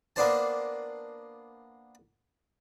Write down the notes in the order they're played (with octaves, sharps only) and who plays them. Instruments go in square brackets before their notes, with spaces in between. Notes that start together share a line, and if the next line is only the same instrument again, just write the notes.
[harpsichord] A#3 B3 D4 C5 A5